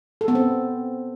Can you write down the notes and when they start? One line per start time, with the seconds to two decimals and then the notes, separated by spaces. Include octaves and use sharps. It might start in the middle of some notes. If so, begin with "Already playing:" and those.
0.21 A4
0.28 B3
0.35 C4